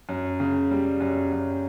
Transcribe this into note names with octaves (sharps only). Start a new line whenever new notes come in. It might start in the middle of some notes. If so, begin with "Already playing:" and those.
F#2
C#3
G3
F#2
F#2